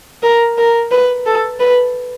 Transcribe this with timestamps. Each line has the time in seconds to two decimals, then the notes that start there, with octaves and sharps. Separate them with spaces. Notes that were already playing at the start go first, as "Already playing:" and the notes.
0.23 A#4
0.58 A#4
0.91 B4
1.26 A4
1.60 B4